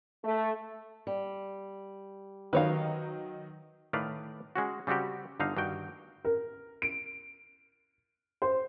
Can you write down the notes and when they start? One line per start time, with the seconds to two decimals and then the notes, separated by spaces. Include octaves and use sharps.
0.23 A3
1.07 G3
2.53 D#3 F#3 D#4 B4 C#5 F5
3.93 A2 D#3 B4 D5 F5
4.56 G#3 C#4 F#4
4.87 C#3 G3 C4 F#4 G4
5.40 G1 D3 D#4 F5
5.57 G2 D#3 F#4 G5
6.25 A#4
6.82 D7
8.42 C5